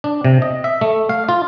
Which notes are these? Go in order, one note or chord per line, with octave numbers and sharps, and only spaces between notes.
D4
C3
D#5
E5
A3
F5
F4